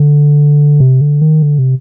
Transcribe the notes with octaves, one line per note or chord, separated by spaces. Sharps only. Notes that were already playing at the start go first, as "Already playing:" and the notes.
Already playing: D3
C3
D3
D#3
D3
C3